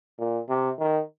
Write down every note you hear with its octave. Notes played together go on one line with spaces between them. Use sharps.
A#2
C3
D#3